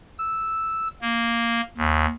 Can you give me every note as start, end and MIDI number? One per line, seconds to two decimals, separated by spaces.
0.18 0.88 88
1.01 1.61 58
1.78 2.06 39